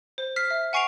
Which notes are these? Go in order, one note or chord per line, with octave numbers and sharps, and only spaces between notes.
C5
F6 B6 C7
E5
F#5 G#5 C#6 C7 D7 F7